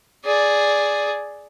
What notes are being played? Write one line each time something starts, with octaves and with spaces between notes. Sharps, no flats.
G#4 D5